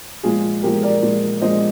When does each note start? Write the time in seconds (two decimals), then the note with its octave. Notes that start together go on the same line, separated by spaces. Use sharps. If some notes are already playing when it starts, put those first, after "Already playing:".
0.23 A#2 F3 G#3 F4 G#4
0.63 A#2 F3 G#3 G4 A#4
0.83 A#4 D5
1.03 A#2 F3 G#3
1.42 A#2 F3 G#3 C5 D#5